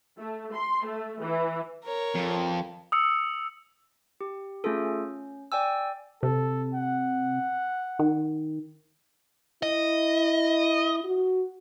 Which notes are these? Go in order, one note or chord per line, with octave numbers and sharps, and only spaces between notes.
A3
C6
A3
E3
A#4 C#5
F2
D#6 E6 C#7
G4
A3 C#4 F4 G#4 A4
C#4
D5 G5 G#5 E6
C3 A4
F#5
D#3
E4 D#5
F#4